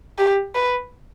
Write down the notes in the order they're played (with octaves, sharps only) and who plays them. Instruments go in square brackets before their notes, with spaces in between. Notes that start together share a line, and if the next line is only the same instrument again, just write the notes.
[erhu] G4
B4